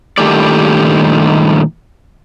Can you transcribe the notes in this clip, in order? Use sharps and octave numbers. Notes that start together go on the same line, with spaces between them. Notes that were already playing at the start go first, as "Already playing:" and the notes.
G2 A#2 D#3 A3 G4 D5